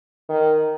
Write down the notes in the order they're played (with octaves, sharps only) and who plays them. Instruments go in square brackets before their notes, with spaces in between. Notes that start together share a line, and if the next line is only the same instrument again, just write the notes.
[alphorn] D#3